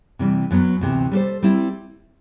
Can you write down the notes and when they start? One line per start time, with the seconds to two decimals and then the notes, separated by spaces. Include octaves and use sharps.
0.19 C3 E3 G3
0.51 F#2 F#3 B3
0.81 D2 C3 E3
1.11 G3 D4 A4 C5
1.43 G3 C4 E4